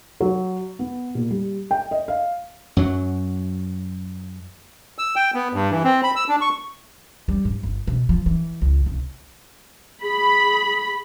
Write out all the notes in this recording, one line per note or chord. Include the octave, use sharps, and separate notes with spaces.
F#3
B3
A#2
G3
G5
D#5
F5
F#2 F#3
E6
G5
B3
G2
E3
C4
B5
E6
D4
C#6
G3
G#2
G1
B2
F3
E3
C#2
C2
G#4 B5